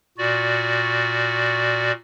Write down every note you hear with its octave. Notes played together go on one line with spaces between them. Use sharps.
A#2 F#4 D5